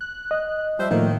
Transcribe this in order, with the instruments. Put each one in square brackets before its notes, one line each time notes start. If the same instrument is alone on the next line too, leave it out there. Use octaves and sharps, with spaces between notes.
[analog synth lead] F#6
[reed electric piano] D#5
[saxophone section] F3 C5 E5 [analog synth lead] G3
[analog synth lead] A2 [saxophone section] D#3 [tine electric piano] F3 A3 A#3